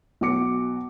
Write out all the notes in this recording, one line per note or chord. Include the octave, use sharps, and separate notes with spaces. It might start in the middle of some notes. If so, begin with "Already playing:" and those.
B1 F#4 D6 C#7